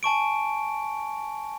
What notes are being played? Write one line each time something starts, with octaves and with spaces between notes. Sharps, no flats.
G#5 A5 C#6 D7